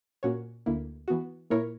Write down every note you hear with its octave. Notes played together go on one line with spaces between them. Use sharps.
A#2 A#3 C#4 F#4 C#5
D2 D3 A#3 E4
E3 B3 F#4
A#2 A#3 E4 A#4 C#5